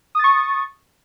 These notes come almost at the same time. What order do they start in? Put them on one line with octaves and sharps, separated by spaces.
D#6 A6 C#6